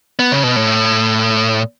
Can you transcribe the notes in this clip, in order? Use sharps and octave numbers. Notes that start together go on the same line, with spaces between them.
B3
C#3
B2
A2